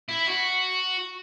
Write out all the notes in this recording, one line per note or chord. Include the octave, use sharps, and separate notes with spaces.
E4
F#4